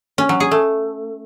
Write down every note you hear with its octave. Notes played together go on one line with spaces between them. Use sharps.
C#4
F#3
G#4
A3